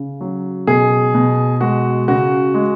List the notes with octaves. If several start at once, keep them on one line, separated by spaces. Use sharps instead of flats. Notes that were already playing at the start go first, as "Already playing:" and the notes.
Already playing: C#3
F#3
B2 G#4
B2
G#3 F#4
C#3 F#4
G#3